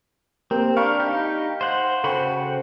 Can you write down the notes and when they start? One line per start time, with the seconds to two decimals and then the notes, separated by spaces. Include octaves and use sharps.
0.51 A#3 C4 G4 A#4
0.77 D4 A#4 F5 B5 C#6
1.00 D#4 G4
1.61 C5 F#5
2.04 C#3 F#4 A4 C5 G5 B5